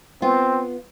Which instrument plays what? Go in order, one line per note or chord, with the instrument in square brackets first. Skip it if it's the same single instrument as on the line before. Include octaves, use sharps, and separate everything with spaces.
[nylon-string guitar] B3 F4 [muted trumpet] C4